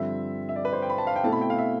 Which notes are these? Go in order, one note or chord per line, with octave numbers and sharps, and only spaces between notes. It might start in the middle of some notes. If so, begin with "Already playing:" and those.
Already playing: G2 D3 F3 C4 E5
E5
D5
B4
C5
G5
B5
A5
F5
G5
B2 A3 C4 E4 A5
B5
G5
F5
E5